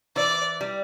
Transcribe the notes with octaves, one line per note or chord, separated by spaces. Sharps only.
E3 D5
G3